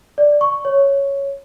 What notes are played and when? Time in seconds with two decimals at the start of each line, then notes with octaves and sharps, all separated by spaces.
0.18 D5
0.41 C#6
0.65 C#5